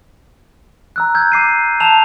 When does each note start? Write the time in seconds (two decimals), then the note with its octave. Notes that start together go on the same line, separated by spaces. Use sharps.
0.96 A#5 E6 F#6
1.15 E6 G6 G#6
1.32 D6 C7 D#7
1.80 A5 E6 E7 F7